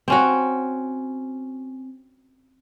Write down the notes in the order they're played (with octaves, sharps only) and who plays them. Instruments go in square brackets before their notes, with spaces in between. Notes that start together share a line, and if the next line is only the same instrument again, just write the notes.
[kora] C4 C#4 F#4